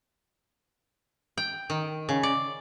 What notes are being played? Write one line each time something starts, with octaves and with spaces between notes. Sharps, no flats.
G5
D#3
C#3
D5